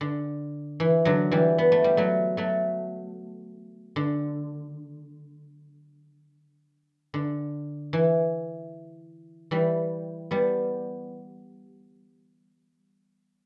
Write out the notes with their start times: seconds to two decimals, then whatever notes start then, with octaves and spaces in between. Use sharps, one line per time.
0.01 D3
0.80 E3
1.05 D3 F#3
1.32 E3 G3
1.58 B3
1.72 A3
1.84 G3
1.97 F#3 A3
2.37 F#3 A3
3.96 D3
7.14 D3
7.93 E3
9.51 E3 G3
10.31 G3 B3